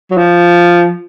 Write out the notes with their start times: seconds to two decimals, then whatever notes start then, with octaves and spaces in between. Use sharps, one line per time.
0.11 F#3
0.17 F3